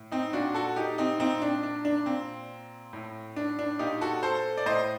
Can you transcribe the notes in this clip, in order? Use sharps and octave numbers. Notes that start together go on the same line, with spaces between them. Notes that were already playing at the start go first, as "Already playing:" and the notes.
Already playing: A2
C4 D#4
A#2 D4 F#4
F#4 A4
D#4 G4
C4 D#4
A#2 C4 D#4
D4
D4
D4
A#2 C4
A2
D4
D4
A#2 D#4 G4
F#4 A4
A4 C5
D5
A2 C5 D#5